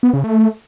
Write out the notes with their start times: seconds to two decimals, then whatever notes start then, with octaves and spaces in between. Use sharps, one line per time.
0.03 B3
0.13 C#3
0.24 A3